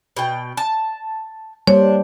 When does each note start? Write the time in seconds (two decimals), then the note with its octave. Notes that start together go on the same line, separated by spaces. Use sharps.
0.17 B2 G5
0.57 A5
1.67 G3 A#3 D4 C5 C#5